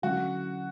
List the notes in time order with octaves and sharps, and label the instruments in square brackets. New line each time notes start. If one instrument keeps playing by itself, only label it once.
[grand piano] D3 F#3 C#4 E4 [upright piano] F#4